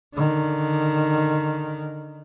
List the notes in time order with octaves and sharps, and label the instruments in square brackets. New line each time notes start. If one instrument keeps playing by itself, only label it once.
[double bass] D3 D#3